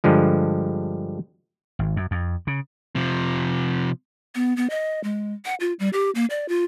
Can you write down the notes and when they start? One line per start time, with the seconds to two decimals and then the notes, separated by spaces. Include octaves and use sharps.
0.04 G2 D3 F3 G#3
1.79 G#1
1.97 F#2
2.11 F2
2.47 C#3
2.96 C3 F3
4.35 B3
4.57 B3
4.70 D#5
5.04 G#3
5.45 F#5
5.60 F4
5.79 G3
5.93 G4
6.15 A#3
6.30 D5
6.49 F4